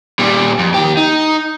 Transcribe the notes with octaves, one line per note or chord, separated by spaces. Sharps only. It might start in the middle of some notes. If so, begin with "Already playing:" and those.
A#2 G3
F2
D#2 G4
D#4